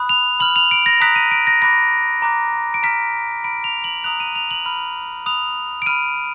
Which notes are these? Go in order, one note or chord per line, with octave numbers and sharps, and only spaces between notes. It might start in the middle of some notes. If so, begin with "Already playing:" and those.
Already playing: B5 D#6 F#6
F7
B5 F6 F#7
F7
D7
A#6
A#5 D#6 F#6 B6
D#7
D7
A#6
B5 D6 F#6 A#6
A#5 D6 F#6
D7
A#5 F6 B6
B5 F6 D7
F7
F#7
A#5 D#6 F#6 F7
D#7
F7
F#7
B5 F6
B5 D#6 F#6 F7
D7
B5 F6 D#7